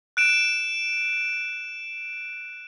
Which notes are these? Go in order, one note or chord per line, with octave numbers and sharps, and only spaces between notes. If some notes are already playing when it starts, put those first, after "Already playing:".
F#6 D7 E7